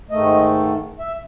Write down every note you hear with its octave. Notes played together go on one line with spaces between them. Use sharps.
G#2 D#3 A3 D#5
E5